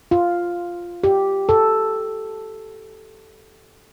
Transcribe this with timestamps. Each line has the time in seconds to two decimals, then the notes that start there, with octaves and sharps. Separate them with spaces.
0.11 F4
1.04 G4
1.49 A4